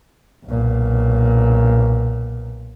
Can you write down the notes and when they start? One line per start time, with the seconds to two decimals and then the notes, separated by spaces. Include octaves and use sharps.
0.45 B1 A#2